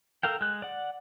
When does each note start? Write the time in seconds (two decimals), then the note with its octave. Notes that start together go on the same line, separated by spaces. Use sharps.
0.23 A4 A#4 F5 G5
0.41 G#3 F#6
0.62 D5 F#5